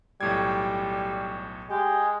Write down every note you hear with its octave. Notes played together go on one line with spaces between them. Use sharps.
B1 A2 G3 G#6
G#3 G4